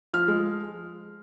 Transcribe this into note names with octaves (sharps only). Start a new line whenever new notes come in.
F3 F6
G#3